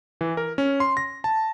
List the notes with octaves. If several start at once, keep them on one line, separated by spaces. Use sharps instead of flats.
E3
A#4
C#4
C6
A#6
A5